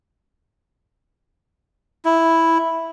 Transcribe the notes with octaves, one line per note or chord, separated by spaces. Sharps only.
E4